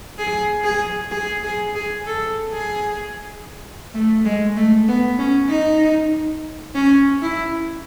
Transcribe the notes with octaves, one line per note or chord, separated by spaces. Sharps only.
G#4
G#4
G#4
G#4
G#4
A4
G#4
A3
G#3
A3
B3
C#4
D#4
C#4
E4